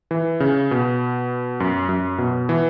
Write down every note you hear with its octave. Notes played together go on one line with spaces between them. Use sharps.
E3
C#3
B2
F#2
F#2
B2
E3